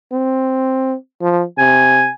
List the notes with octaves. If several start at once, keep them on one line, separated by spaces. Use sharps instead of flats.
C4
F3
C3 G#5